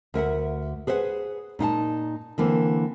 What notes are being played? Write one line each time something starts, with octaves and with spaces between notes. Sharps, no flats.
D2 A#4 E5 F#5
G#4 B4 C5 E5 F#5
A#2 D#4 F5 A5
D3 E3 A#3 C4